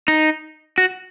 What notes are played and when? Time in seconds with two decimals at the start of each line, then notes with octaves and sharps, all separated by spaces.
0.08 D#4
0.78 F#4